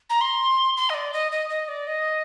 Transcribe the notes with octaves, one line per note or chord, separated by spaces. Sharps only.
A#5
C6
C6
D#5
D5
D#5
D#5
D#5
D5
D#5